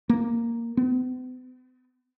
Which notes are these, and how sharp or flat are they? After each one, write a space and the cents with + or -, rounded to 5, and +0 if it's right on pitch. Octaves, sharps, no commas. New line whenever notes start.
A#3 -5
B3 +45